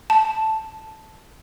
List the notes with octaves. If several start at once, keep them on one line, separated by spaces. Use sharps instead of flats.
A5